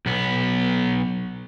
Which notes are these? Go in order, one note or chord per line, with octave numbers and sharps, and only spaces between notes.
B1 B3